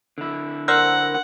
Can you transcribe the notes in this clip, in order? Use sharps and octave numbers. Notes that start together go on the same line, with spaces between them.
D3 E4
A#4 C5 D5 F#5 E6 F#6 A#6